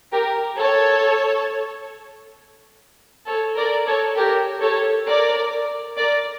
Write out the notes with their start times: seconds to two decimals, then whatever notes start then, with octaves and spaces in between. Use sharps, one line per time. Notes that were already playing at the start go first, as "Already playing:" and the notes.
0.11 G4 A#4
0.56 A4 C#5
3.26 A4 C#5
3.56 A#4 D5
3.87 A4 C#5
4.16 G4 A#4
4.61 A4 C#5
5.06 A#4 D5
5.96 A#4 D5